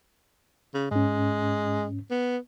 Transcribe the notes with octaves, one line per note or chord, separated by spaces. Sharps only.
C#3
G#2 G#3 C#4
B3